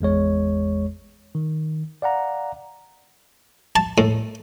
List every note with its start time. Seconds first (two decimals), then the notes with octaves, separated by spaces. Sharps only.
0.01 G#1 E2 G#3 C#5
1.35 D#3
2.02 D5 F5 F#5 A#5
3.76 A5
3.98 A2